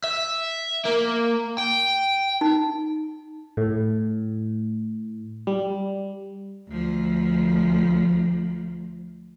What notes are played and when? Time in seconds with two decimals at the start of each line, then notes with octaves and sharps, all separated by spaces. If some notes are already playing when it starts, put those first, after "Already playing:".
0.04 E5
0.86 A#3
1.58 G5
2.41 D#4
3.57 A2
5.47 G3
6.69 D2 F3